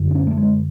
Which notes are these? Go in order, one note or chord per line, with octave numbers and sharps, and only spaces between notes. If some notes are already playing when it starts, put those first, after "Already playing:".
Already playing: F#2 D3
D4
C#4
A3
G#3